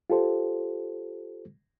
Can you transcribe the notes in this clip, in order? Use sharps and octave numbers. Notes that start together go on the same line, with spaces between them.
F4 G4 A4 C5